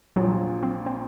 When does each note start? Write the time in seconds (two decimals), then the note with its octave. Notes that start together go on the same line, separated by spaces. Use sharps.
0.16 A#1 A#2 F3 F#3
0.63 C4
0.86 C4